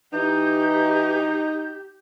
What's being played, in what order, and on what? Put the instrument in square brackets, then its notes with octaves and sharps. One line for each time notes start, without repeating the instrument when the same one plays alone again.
[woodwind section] E3 [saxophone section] D#4 [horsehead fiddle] G4 [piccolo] G6